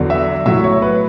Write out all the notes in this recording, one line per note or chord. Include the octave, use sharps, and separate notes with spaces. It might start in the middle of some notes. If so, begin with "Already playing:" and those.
Already playing: E2 D3 F#3
E5
A2 F#3 E5
C#5
B4